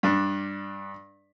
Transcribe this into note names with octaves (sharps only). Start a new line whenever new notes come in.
G2 D4